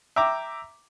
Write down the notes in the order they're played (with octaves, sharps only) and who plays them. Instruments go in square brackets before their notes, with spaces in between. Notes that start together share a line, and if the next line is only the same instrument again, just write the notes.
[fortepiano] E5 G5 A#5 D6